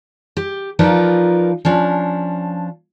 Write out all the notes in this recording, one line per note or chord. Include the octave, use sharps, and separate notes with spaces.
G4
F3 D#4 F4 A#4 B4 D5
F3 C#4 D4